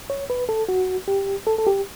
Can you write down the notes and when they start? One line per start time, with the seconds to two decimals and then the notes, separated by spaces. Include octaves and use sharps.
0.10 C#5
0.30 B4
0.49 A4
0.69 F#4
1.08 G4
1.47 A4
1.58 A4
1.67 G4